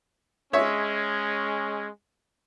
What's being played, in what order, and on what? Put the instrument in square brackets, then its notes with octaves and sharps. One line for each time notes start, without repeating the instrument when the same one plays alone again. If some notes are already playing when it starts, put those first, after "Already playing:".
[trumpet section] G#3 C#4 [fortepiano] C#5 E5